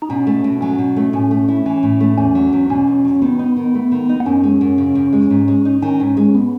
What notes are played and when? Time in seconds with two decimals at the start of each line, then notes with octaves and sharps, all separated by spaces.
0.02 D#4
0.10 B2 C#4
0.27 A3
0.44 B2
0.61 F#3 C#4
0.78 B2
0.97 A3
1.13 A2 C#4
1.31 A3
1.48 E4
1.66 E3 C#4
1.83 A2
2.00 A3
2.18 E2 C#4
2.35 F#3
2.53 E2
2.70 B2 C#4
2.87 E2
3.05 F#3
3.22 D#3 B3
3.39 D#4
3.56 D#3
3.74 A3
3.92 D#3
4.09 D#4
4.20 B3
4.26 F#2 C#4
4.43 G#3
4.61 F#2
4.78 C#3
4.95 F#2
5.13 G#3
5.30 G#2
5.48 G#3
5.65 D#4
5.82 D#3 C#4
6.00 G#2
6.17 G#3
6.35 B3